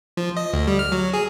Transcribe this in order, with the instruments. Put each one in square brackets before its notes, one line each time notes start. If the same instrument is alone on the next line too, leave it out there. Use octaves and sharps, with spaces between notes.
[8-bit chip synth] F3
D#5
D2
G3
F6
F#3
G#4